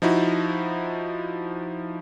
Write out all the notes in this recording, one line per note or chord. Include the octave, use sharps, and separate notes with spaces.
F3 D#4 E4 F#4